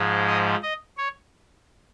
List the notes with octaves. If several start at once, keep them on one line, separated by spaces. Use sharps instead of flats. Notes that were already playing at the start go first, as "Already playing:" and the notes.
Already playing: G#2 F3 G#3
D#5
D#5
C#5